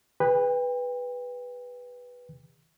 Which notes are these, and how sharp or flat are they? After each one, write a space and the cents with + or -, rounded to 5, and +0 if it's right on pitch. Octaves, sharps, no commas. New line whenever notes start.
G#4 -35 B4 +0 G5 +35